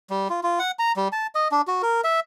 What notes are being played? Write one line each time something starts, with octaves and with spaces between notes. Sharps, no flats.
G3
F4
F4
F#5
A#5
G3
A5
D#5
D4
F#4
A#4
E5